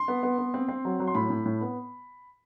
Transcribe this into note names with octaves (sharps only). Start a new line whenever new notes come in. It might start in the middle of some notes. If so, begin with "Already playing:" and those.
Already playing: C6
B3
B3
B3
C4
C4
F#3
F#3
C6
A2 B5
A2
A2
B3